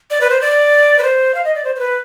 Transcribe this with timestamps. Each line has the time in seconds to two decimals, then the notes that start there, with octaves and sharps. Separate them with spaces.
0.10 D5
0.21 B4
0.30 C5
0.41 D5
0.98 B4
1.02 C5
1.34 F5
1.44 D#5
1.55 D5
1.64 C5
1.75 C5
1.79 B4